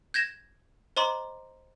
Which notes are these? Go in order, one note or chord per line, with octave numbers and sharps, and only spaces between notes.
G6 G#6 A#6 E7
C5 D#5 A#5 C6 D6